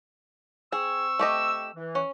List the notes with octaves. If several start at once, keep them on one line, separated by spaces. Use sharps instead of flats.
C4 G#4 C#6 E6
A3 G4 D#5
E3
C#4